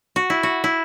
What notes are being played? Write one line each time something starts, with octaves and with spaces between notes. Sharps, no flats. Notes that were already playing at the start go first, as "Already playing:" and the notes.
F#4
E4
F#4
E4